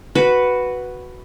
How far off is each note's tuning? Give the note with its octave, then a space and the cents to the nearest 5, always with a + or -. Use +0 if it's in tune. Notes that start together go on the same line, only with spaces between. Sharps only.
F#4 +0 B4 +0